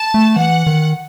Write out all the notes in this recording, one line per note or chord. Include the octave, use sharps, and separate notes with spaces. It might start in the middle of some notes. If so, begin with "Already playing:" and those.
Already playing: A5
A3
E3 F#5
D#3